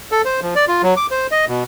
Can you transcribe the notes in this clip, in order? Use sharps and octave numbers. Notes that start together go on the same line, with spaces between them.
A4
C5
F3
D5
F4
F#3
D6
C5
D#5
B2